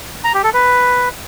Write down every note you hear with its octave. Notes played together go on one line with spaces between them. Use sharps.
A#5
G4
A4
B4